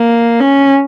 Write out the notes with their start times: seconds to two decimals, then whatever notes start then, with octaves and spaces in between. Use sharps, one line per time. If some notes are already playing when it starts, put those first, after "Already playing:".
Already playing: A#3
0.40 C#4